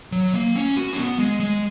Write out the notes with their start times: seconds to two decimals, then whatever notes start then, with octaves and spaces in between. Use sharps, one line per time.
0.12 F#3
0.33 A#3
0.56 C#4
0.77 F#4
0.93 C#4
0.97 B3
1.19 G#3
1.40 G#3